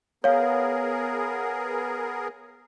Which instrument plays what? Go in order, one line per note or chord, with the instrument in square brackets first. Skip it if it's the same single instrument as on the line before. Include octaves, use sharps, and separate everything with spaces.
[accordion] B3 G#4 A#4 [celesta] C#5 F5